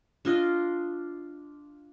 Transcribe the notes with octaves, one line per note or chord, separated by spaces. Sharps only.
D4 F4 D#5